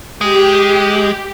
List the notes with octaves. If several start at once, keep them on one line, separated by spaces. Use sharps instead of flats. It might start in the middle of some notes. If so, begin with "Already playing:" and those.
G#3 G4